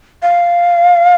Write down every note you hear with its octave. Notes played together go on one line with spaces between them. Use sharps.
F5